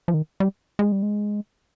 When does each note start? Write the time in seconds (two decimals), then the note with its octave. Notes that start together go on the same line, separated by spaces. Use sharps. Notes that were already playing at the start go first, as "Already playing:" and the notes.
0.08 F3
0.14 D#3
0.40 G3
0.79 G#3
0.92 G3
1.03 G#3